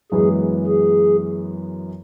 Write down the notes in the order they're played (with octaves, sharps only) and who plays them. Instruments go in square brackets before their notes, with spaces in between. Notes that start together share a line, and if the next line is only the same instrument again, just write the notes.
[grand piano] F#2 E3 G#3 B3 [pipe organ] G#4
[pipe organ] G#4